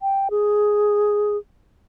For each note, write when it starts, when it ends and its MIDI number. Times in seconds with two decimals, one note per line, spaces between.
0.01 0.28 79
0.31 1.37 68